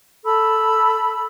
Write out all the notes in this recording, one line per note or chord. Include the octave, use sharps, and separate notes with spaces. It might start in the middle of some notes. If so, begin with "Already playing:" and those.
A4 B5 E6